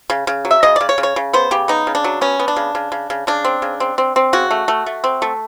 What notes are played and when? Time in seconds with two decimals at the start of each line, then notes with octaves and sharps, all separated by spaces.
0.10 C#3
0.27 C#3
0.45 F#3
0.51 E5
0.63 C#3 D#5
0.76 C#3 D5
0.89 C#5
0.98 C#3
1.03 C#5
1.16 C#3
1.33 B3 C5
1.51 C#3 G4
1.68 B3 D#4
1.87 C#3
1.95 D4
2.04 F#3
2.21 B3 C#4
2.39 B3
2.48 D4
2.56 C#3
2.75 C#3
2.92 C#3
3.10 C#3
3.27 C#3 D4
3.44 C4
3.62 C#3
3.80 C4
3.98 C4
4.16 C4
4.33 C#3 F#4
4.51 A3
4.68 A3
4.86 A3
5.04 C4
5.22 A3